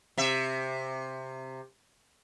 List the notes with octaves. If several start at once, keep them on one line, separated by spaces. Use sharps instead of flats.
C3 E5